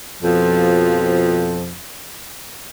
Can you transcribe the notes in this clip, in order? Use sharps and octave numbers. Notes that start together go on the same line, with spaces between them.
F2 B2 F3